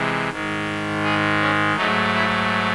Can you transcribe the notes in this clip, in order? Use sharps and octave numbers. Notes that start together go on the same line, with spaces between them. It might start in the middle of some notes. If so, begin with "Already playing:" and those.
Already playing: C3 E3 G#3
G#2 D#3 G#3
G#4
C#4
G#2 F#3 A3 D#4
E4